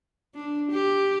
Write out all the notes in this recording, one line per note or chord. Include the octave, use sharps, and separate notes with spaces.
D4
G4